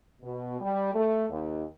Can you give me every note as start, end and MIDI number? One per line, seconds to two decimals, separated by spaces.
0.22 0.57 47
0.61 0.90 55
0.94 1.25 57
1.29 1.63 39